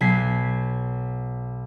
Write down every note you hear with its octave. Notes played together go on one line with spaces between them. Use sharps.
B1 G#6 B6 C7